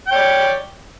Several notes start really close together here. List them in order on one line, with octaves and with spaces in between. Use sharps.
G5 C#5 D5